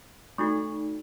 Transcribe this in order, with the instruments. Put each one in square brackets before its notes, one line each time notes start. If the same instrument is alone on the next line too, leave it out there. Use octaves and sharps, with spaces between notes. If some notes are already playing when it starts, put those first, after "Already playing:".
[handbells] A3 D#4 F#4 A4 C#6